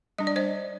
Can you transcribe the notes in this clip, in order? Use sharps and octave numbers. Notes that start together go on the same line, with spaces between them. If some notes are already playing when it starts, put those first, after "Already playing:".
G3 D4 D#5
D5
C5 D#5